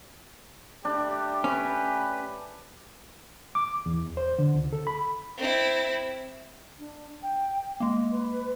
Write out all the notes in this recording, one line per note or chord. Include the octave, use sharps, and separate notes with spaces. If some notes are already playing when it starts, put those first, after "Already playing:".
G3 A3 D4 G4
C#4 B4
D6
E2
C5
D3
C#2
A4
B5
C4 E4
D4
G5
G#3 A#3 D#5
B4